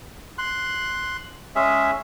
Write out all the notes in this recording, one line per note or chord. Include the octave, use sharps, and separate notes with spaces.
C6 F#6
G#3 C#4 G#4 E5